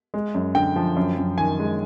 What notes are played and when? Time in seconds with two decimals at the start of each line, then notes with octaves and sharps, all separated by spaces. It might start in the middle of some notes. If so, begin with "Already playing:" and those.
0.14 G#3
0.34 F#2
0.55 D3 G5
0.76 F3
0.96 F#2
1.18 F#2
1.38 D#3 G#5
1.60 G#3